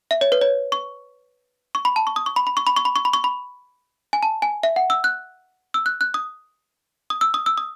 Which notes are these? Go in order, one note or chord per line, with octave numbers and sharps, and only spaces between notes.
E5
C#5
B4
C#5
C#6
C#6
B5
A5
C#6
D#6
C#6
B5
B5
C#6
B5
C#6
B5
C#6
B5
C#6
B5
G#5
A5
G#5
E5
F#5
E6
F#6
E6
F#6
F#6
D#6
D#6
E6
D#6
E6
D#6